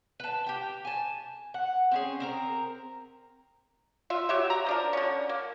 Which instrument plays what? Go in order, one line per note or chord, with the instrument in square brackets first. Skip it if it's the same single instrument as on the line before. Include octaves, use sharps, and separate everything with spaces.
[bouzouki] B4 A5
G4 G5
G#5 A5
F#5
C4 C#4 G#4
C4 A#4 A#5
[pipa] F4 E5
F#3 G4 E5
A#5
F3 D4 A#4
D3 C#4
A#3